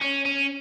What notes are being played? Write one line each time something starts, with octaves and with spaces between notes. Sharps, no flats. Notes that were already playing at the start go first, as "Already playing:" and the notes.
C#4
C#4